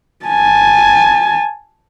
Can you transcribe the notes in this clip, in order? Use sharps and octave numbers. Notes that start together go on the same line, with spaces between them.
G#5 A5